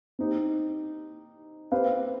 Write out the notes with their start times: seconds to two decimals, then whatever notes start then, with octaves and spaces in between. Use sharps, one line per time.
0.19 C4 D#4 G4
1.72 C4 G4 B4 F5